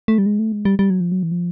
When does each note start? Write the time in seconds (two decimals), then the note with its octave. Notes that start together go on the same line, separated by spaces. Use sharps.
0.08 A3
0.18 G3
0.26 G#3
0.39 A3
0.52 G#3
0.65 G3
0.79 G3
0.90 F#3
1.00 F3
1.12 F#3
1.23 E3
1.32 F3